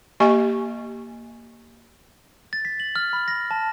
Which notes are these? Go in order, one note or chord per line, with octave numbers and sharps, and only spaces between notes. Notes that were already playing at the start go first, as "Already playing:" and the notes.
A#3 G4 D#5 G#5 C#6
A6
B6
F#7
F6
B5
A#6
A5